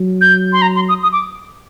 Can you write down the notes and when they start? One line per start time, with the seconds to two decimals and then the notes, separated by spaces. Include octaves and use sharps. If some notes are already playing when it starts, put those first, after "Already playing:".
Already playing: F#3
0.21 G6
0.53 C6
0.62 A#5
0.76 C6
0.89 D#6
1.03 D#6
1.13 D6